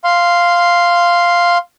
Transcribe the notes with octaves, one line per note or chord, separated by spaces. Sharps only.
F5 C6